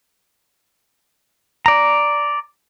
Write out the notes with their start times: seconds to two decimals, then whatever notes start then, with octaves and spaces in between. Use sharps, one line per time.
1.66 D5 A#5